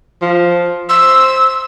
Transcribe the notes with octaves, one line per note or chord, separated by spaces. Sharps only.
F3
C5 E6